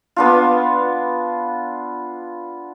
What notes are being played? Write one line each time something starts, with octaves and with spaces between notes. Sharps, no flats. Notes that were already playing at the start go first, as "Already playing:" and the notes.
B3 D4 F4